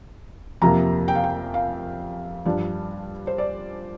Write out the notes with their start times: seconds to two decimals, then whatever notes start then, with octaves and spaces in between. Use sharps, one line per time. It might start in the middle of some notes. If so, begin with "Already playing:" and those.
0.62 F2 C3 F3 A#3 A#5
1.08 G5
1.15 F5
1.24 G5
1.54 F5
2.45 G2 F3 D4
3.27 C5
3.38 D5